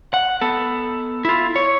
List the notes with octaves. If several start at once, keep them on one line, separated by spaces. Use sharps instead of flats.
F#5
B3 A4
E4 F4
C#5